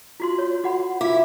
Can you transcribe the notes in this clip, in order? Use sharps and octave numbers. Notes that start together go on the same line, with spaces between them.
F4 F#4 C6
C#5
F#4 F#5 B5
E4 F4 F5 D6